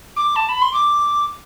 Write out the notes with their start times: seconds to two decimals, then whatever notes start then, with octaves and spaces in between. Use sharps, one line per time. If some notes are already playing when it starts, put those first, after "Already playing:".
0.16 D6
0.36 A5
0.49 B5
0.62 C6
0.74 D6